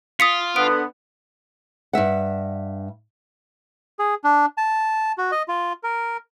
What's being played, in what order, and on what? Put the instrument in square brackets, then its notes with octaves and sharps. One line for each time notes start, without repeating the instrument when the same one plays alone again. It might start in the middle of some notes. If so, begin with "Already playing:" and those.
[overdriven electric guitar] F4 [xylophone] D#6 B6 C#7
[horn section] D3 B3 [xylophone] D7
[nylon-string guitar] G2 G#3 E5 F#5
[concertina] G#4
D4
A5
F#4
D#5
F4
A#4